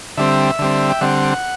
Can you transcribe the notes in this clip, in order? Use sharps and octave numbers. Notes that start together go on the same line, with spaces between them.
D3 G3 C4 E5
D3 G3 C4
G5
D3 G3 C4 F#5